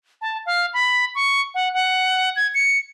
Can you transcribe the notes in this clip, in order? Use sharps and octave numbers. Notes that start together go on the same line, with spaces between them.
A5
F5
B5
C#6
F#5
F#5
G#6
C#7